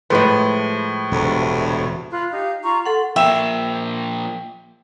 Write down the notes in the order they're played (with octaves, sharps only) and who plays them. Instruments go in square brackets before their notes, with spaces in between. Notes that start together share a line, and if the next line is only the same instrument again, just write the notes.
[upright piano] A2 B4 [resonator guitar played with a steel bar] F3 G#3
[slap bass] E1 C3 [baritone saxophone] D2
[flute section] F4 B5 F#6
D#4 G4 F5
F4 A#5 C#6
[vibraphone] A4 F#5 [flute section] C6
[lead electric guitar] F3 A#3 [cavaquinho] E5 [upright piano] G5 E7